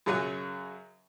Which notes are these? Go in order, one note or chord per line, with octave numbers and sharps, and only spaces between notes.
F#2 C#3 F#3 C#5 G#5